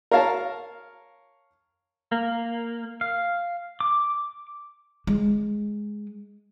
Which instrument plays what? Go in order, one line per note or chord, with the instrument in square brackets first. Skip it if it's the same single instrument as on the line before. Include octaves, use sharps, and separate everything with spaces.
[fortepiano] A#4 C#5 F5 A5
[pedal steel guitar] A#3
F5
D6
[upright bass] G#3